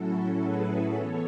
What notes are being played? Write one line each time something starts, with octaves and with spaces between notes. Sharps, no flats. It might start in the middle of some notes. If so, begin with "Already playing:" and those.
Already playing: A2 F#3 C#4 E4 F#4 A4
G#4 B4
E3 B3 A4 C#5